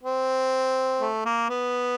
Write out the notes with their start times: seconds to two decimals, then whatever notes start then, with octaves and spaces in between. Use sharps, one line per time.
0.03 C4
1.01 A3
1.25 A#3
1.49 B3